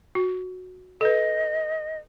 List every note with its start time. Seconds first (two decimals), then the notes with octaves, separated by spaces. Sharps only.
0.15 F#4
1.01 A4 B4 D#5